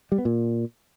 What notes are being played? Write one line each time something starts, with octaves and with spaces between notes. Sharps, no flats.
G3
B3
A#2